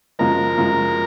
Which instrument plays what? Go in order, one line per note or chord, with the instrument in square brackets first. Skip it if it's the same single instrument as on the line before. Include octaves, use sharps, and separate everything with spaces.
[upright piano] F#2 C#3 F3 G#3 [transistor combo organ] A#4
[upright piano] F#2 C#3 F3 G#3